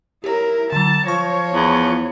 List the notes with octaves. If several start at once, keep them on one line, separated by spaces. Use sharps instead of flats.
E4 G4 A#4 C#5
D3 F#3 A5
F3 C#5 C#6 A#6
E2